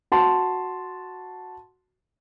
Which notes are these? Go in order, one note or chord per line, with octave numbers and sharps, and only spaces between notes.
F#4 A5 C6